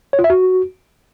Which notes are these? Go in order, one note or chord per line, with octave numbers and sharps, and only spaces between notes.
C#5
F4
E5
F#4